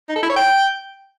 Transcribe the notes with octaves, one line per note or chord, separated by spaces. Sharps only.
D#4
A4
E4
C#5
G5